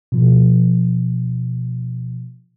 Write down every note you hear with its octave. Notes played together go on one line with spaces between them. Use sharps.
B2 F3